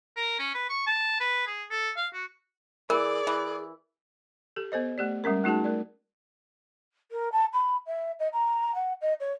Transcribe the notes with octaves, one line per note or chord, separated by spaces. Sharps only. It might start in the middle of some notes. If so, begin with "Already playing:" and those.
A#4
C#4
B4
C#6
A5
B4
G#4
A4
F5
F#4
E3 G#4 A#4 D5
E3
G4 A4
B3 A4 C5 D#5
A3 G4 D5
G3 G#3 C#4 A#4
A3 D#4 F#4 G#4 A5
A3 A#4 D5
A#4
A5
B5
E5
D#5
A#5
F#5
D#5
C#5